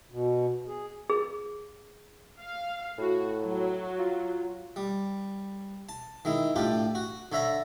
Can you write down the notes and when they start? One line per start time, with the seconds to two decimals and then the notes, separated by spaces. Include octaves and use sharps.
0.12 B2
0.67 G#4
1.10 G#4
2.40 F5
2.98 A2 F#4
3.42 F#3
3.99 F4
4.76 G3
5.89 A5
6.25 D#3 G#3 E4
6.56 A2 D4 F4 G4
6.95 F#4
7.32 D3 C#5 E5 A#5 B5